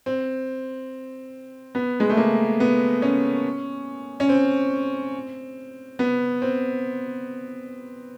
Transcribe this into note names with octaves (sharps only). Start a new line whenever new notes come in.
C4
B3
G#3
A3
A#3
B3
C#4
C#4
C4
B3
C4